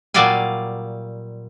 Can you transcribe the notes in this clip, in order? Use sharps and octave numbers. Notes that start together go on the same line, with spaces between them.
A#2 F#3 G3 D5 F5 G#5